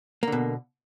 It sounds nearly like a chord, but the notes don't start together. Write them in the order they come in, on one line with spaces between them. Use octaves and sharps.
A#3 D3 B2